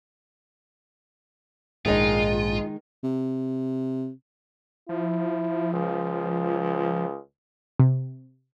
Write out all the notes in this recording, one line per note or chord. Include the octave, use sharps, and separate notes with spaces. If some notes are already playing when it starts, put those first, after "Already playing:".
A#1 G#2 D#3 G#3 D#4 F4 G#4 D#5
C3
F3 E4
C#2
C3